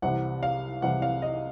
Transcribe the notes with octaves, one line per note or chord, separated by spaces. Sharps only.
C2 C3 E3 F#5
F5
C2 C3 E3 F#5
F5
D#5